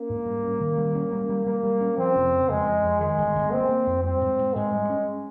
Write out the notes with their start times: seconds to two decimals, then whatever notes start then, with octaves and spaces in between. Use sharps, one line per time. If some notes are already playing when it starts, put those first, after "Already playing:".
Already playing: A#3 C#4
0.09 G#2
0.26 G3
0.43 C#4
0.60 D#3
0.78 G3
0.95 C#4
1.12 G3
1.29 G3
1.46 G3 A#3
1.63 G3
1.81 C#4
1.98 F3 C4
2.15 F1
2.32 C#3
2.49 F2 G#3
2.66 F2
2.83 F2
3.01 D#3 G#3
3.18 G1
3.35 G1
3.52 A#3 C4
3.69 A#3
3.87 F2
4.04 G3 C4
4.21 G#2
4.39 G#2
4.55 G#2 G#3
4.73 G3
4.90 C#4